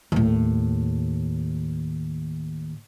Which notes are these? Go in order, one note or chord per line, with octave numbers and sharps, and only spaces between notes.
D#2 A2